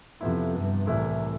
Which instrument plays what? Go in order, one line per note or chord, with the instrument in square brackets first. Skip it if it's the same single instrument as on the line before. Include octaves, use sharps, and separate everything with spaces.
[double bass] F2 [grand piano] C3 F3 B3 E4
[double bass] G2
[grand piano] C2 C3 E3 A3 E4 [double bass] A2